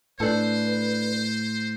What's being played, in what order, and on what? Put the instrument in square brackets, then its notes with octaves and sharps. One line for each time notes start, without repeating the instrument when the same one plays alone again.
[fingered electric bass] A2 [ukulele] D4 A4 [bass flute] B4 [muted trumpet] C5